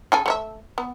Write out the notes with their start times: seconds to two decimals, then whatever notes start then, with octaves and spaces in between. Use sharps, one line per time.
0.12 C#3 A4 G#5
0.26 A3 C#5 E5
0.78 B3